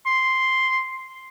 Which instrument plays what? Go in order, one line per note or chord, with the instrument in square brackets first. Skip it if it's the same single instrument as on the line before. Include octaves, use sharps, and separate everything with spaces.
[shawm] C6